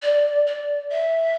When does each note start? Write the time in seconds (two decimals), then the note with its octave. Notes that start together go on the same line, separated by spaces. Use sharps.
0.02 D5
0.47 D5
0.90 E5